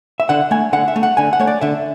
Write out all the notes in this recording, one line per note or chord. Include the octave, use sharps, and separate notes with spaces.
E5
D3 F#5
A3 G#5
D3 F#5
E5
A3
F#5
D3 G#5
F#5
A3 C#5
D5
D3 E5